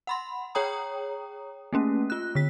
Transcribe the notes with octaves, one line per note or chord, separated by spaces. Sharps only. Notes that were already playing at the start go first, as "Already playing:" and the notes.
F#5 B5 C6
G#4 C#5 G5 A#5 D#6
A3 A#3 C#4
F4 F#6
D3 B6